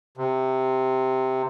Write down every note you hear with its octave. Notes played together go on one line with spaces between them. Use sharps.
C3